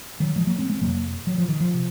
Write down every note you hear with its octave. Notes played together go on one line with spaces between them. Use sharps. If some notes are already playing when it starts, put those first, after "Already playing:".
D#3 F#3
F3 G#3
F#3 A#3
G#3 C4
G#3 C4
F2 C3 F#3 A#3
F#3
F3
D#3
F3
C3